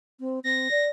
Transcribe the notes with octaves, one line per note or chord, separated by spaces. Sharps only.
C4
C4 A#6
D5